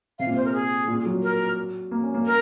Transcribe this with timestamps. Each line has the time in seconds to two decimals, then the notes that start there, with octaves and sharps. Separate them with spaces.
0.19 C3 F5
0.26 A#2
0.33 C3 C5
0.45 A#4
0.53 G#4
0.88 A#2
1.06 F#3
1.23 A#4
1.91 A#3
2.03 C#4
2.14 A#3
2.26 A#4